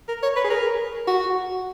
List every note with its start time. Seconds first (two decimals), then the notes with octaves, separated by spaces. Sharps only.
0.09 A#4
0.23 C#5
0.36 B4
0.44 G#4
0.50 A#4
1.07 F#4